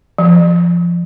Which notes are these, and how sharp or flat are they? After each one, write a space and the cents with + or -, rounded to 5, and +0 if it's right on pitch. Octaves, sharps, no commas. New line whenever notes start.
F3 -20